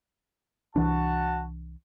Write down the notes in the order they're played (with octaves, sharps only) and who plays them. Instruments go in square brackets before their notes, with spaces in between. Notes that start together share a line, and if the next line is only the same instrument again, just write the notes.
[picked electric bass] C2 E3 D4 [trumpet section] F#4 A5